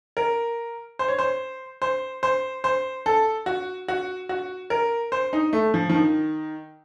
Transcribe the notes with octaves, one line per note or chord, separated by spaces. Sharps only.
A#4
C5
C#5
C5
C5
C5
C5
A4
F#4
F#4
F#4
A#4
C5
D#4
A3
F3
F3
D#3